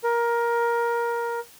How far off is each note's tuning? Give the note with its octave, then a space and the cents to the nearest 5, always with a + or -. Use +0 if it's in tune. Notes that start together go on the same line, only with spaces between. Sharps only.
A#4 +15